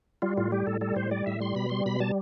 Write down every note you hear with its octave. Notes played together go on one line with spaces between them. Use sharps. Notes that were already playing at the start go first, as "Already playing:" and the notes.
G3 F4
A2 F4
G3 G4
A2 A4
G3 A4
A2 C5
G3 D5
A2 E5
G3 C6
B2 B5
G3 C6
B2 B5
G3 A5